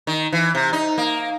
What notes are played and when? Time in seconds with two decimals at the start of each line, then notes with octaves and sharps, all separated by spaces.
0.07 D#3
0.33 E3
0.55 C3
0.73 D#4
0.98 A#3